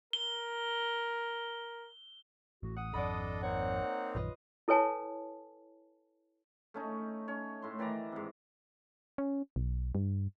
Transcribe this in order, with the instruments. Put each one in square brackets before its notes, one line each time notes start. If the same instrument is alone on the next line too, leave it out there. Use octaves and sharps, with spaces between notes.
[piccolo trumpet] A#4 [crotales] G7
[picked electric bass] A1 A2 [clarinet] F#4
[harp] F#5 [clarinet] D#6
[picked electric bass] G#1 F2 [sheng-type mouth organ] D4 A4 D#5 [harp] D5 F#5 B5
[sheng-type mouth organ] A#3 C4 D#4 [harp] C#5 [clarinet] F#5
[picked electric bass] A#1 F#2 D#3 [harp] F4 B4 D#5
[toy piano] E4 A4 B4 C#5 G#5 A5
[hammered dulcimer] A3 C#4 D#4
C#4 C#5
A2 C6
D#3 E3 D5 A#5
G#2 C3
[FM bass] C#4
B1
G2